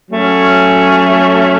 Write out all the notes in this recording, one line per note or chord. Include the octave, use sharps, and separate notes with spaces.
F#3 A3 C#4